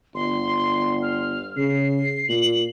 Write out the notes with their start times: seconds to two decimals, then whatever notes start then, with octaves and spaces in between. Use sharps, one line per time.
0.15 G1 C6
1.02 F6
1.57 C#3 C7
2.29 A#2 F#7